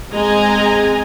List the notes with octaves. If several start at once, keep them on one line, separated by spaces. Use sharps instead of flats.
G#3 C4 D#5 G#5 A#5